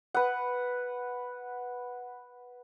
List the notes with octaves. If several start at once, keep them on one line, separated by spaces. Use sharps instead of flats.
B4 F#5